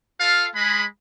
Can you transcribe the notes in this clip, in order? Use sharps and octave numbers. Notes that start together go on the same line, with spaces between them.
F4 A4 F5
G#3 B5